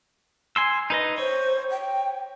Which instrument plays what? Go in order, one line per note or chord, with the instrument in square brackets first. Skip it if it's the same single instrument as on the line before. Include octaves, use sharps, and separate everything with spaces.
[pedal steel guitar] G#5 C6 E6
D#4 B4 D#5
[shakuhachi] C5 [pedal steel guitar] C#5
[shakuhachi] G5